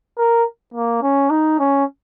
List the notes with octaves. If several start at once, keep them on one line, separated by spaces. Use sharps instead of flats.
A#4
A#3
C#4
D#4
C#4